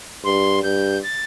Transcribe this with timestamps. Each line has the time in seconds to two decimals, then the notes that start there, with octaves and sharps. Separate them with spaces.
0.24 G2 C6
0.63 G2 G6
1.03 A6